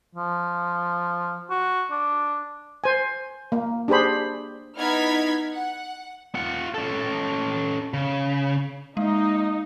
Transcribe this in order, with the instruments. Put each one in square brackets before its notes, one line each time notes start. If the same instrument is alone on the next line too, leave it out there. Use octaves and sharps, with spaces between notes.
[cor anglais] F3
F#4
D4
[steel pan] C5 G#5
A#3
D4 G4 G#4 C5 B5
[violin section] B3 D#4 E4 F6 G#6 B6
F#5
[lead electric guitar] F4 F#5
C#4 A4
C#3
[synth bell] G#3 [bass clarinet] A#3 [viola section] D#4